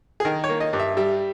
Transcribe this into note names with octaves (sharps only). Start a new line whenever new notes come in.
G#4
D#3 A#4
C#5
A#3
D#5
G2
E5
G3 E5